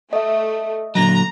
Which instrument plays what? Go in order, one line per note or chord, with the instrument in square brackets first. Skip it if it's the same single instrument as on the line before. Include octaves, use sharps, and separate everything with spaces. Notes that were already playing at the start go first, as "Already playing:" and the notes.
[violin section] A3 [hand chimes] D#5 E5
[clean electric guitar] A#2 D3 F#3 [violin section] A#5